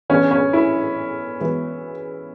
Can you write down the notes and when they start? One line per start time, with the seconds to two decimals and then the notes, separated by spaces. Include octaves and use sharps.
0.10 E3 B3 C#4 D4 G#4
0.31 C#4
0.53 E4
1.40 E3 G#3 B3 F#4